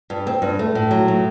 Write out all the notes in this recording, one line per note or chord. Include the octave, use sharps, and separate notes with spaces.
G2
C4
G2
A3
A2
F#3
A2